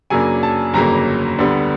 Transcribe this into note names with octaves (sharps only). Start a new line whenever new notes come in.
F#2 C#3 F#3 A#3 D4 G#5
A5
G1 F2 C#3 F#3 A#3 A#5
D2 D3 G3 B3